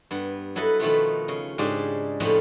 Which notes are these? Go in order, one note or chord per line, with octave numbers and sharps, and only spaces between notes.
G2 B3
F#3 E4 A4 B4 D#5 B5
B2 D#3 F3 A3 F4 B4
C#3
G#2 C#3 G#3 D4 G4
F2 A2 F3 F4 D#5 B5